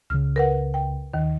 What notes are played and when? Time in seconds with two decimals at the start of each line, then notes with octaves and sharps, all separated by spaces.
0.10 C#2 C#3 F6
0.36 A#4 B4 F#5
0.74 G5
1.14 D#2 D#3